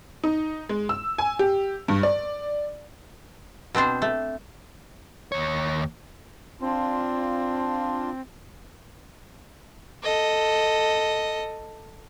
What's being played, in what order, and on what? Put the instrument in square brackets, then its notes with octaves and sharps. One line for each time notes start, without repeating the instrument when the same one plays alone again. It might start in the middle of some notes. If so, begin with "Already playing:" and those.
[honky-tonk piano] D#4
G#3
E6
G#5
G4
G2
D5
[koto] B2 C4 D4 C5 G5
A3
[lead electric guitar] D#2 C#5
[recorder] C4 [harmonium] D4 F4
[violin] A4 D#5